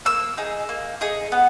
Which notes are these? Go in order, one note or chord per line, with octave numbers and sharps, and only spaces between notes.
A#3 E6
D#4 G#4
A#3
D#4 G#4
B3